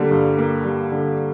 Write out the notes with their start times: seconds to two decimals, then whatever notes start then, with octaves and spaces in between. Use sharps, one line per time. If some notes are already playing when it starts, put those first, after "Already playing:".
Already playing: D3 G3 A#3
0.11 G2
0.38 A#3
0.65 G3
0.92 D3